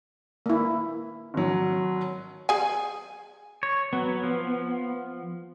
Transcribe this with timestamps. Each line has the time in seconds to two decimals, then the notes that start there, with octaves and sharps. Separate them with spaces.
0.46 A#3 E4
1.34 G#1 F#3
2.49 G#4 G#5
3.63 C#5
3.93 F#3 B3
4.23 F3